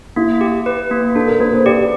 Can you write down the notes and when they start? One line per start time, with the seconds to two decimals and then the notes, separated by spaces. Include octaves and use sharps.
0.16 A#3 E4
0.41 G4
0.66 B4
0.91 A#3
1.15 D4 A4
1.28 A#4
1.40 A#3 B4
1.53 C5
1.66 G4 D5